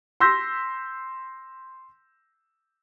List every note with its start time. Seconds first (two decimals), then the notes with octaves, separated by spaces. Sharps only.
0.20 C6 E6 G6 A#6 B6